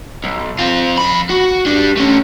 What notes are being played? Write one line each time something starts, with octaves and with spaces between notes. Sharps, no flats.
B1
C4 F4
F2 B5
F#4
G3 D4
A3 C#4